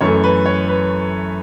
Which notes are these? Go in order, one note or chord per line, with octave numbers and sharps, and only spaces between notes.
F#2 E3 A3 C#5
B4
C#5
B4